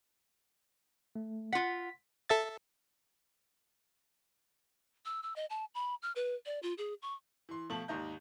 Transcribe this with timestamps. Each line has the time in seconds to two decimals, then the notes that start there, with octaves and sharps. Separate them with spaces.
1.15 A3
1.53 F4 F#5 B6
2.29 A4 E5 A6
5.05 E6
5.23 E6
5.36 D#5
5.50 A5
5.75 B5
6.02 F6
6.16 B4
6.46 D5
6.63 F4
6.78 G#4
7.02 C#6
7.49 E3 C6
7.70 B2 F3 A3 A5 F#7
7.88 G#1 D#2 D#4 D#5 A#5 G6